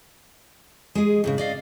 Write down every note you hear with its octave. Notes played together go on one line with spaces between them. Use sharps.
G#3 G#4
D#2 G#2 C#3
D5 D#5 F5